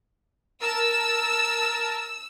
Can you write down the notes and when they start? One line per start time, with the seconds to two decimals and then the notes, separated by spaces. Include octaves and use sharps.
0.61 A#4 A5 E6